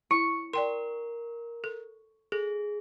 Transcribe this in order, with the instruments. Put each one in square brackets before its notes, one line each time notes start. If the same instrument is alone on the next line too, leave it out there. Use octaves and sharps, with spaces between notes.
[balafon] E4 [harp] C#6
[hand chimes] A#4 [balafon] D5 G5 C6
[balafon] A4
[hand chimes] G#4 [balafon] A4